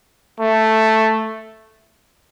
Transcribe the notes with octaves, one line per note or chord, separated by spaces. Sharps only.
A3